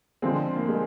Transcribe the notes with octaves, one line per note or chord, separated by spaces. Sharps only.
D3 F3 G#3 C4
A#3
G#3